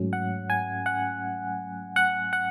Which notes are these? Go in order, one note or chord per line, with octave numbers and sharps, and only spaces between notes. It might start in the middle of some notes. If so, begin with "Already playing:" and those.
Already playing: G#2 F#3 A3 C#4
F#5
G#5
F#5
F#5
F#5